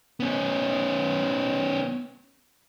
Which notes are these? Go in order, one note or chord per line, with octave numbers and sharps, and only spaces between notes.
B3 C#4